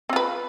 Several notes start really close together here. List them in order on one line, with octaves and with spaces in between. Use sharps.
C4 F4 B4